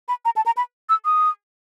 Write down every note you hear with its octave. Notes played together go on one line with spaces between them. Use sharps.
B5
A#5
A5
A#5
B5
E6
D#6